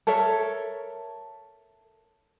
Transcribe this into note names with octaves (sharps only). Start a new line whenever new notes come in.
A4 A#4 C#5 E5